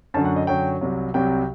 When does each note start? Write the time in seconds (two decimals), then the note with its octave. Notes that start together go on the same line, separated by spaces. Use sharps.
0.14 F#2 D3 F#3 A5
0.25 F#5
0.36 D#5
0.47 F#2 D3 F#3 G5
0.81 C2 C3 F#3
1.14 C2 C3 F#3 G5